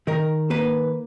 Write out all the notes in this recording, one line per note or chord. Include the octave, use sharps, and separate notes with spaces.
D#3 A#4
A#3 B4